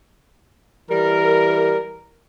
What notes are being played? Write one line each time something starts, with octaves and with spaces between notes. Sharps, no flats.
E3 G3 A#4